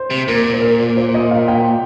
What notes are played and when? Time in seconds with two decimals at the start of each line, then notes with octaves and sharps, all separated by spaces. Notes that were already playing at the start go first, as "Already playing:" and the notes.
Already playing: C5
0.10 C3
0.27 A#2 A#4
0.53 C5
0.62 A#4
0.97 C5
1.14 D#5
1.31 F5
1.48 G5